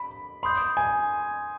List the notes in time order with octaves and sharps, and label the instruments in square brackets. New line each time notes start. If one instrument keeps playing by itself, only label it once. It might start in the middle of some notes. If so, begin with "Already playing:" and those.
Already playing: [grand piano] B5
[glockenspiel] B5 D#6 G6 [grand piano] C6
[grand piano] G#5